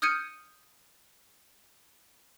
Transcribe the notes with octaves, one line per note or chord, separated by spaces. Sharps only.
D#6 F6 G6 G#6 C#7 D#7